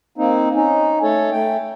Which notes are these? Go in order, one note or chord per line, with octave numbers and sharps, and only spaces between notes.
A#3 C4 D#4
C#4 D#4
A3 A4 C#5
A3 G5